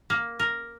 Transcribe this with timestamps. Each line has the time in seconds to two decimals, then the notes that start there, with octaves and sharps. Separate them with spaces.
0.10 A#3
0.39 A#4